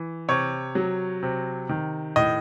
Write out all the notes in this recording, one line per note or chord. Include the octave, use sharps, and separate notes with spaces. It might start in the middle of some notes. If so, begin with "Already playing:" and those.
Already playing: E3
C3 C#5
F#3
C3
D#3
A2 D#5